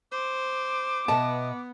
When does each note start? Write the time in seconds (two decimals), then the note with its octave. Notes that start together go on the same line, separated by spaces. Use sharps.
0.12 C5 D6
1.08 B2 B3 D#5 E5 A5